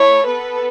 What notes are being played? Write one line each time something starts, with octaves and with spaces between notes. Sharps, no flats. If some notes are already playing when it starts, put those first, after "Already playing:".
Already playing: A3 E4 C#5
B3 A4 B4